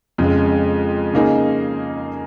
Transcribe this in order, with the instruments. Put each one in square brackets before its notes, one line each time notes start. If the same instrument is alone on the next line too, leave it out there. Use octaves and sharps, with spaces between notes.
[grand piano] F2 C#3 G#3
C#3 A#3 D#4 G#4